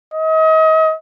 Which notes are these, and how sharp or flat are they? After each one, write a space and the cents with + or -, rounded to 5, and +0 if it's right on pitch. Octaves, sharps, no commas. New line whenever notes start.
D#5 +35